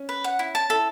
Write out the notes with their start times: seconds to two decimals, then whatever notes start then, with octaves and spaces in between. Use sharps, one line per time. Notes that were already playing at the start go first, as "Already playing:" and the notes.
Already playing: C#4
0.09 B4
0.24 F#5
0.39 E4
0.55 A5
0.70 E4 A4